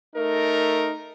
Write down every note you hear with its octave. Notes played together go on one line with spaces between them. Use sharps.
A3 D#4 A#4